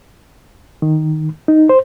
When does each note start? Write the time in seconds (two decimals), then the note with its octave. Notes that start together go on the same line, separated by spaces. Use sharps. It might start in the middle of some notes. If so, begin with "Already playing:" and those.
0.82 D#3
1.48 D#4
1.69 C5